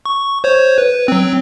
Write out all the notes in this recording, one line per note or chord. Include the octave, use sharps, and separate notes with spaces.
C#6
C5 C#5
B4
F#3 C4